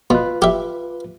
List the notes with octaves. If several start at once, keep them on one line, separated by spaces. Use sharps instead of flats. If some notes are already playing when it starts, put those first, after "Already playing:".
B2 F4 B4
G4 E5